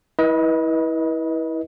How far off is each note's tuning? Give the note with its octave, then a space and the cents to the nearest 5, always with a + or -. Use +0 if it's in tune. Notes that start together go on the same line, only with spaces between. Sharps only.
E4 -25 B4 -30 D#5 +20